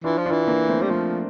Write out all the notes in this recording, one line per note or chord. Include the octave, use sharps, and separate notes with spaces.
E3 D4 F4
F3
D4 F4
E3
A#3 D4
A3 C4
G3
F3 A3